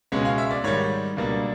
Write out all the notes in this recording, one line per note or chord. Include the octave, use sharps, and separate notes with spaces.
C#2 B2 G#3 C#4
F5
E5
D5
G#2 D#3 G3 C#5
C#2 B2 G3 A#3 D4